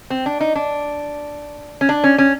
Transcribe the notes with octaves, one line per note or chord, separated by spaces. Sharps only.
C4
D4
D#4
D4
C#4
D4
C#4
C#4